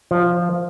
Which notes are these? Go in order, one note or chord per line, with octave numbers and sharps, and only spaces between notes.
F3